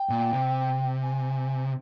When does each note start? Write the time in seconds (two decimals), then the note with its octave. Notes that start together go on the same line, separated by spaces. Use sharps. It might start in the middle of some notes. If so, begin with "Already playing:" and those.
Already playing: G5
0.09 A#2
0.33 C3
1.02 G#5